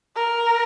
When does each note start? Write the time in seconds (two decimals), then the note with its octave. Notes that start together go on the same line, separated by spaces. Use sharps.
0.16 A#4